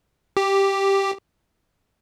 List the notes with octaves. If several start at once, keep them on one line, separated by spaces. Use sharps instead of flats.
G4